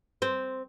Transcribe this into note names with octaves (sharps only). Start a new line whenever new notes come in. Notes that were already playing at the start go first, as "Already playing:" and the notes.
C4